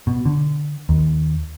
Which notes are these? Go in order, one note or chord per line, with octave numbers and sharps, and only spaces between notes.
B2
D3
D#2